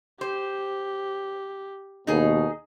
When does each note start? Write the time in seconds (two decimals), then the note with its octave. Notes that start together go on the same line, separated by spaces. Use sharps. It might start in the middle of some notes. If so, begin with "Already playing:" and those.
0.21 G4 C5
2.07 D#2 B2 D#4 G#4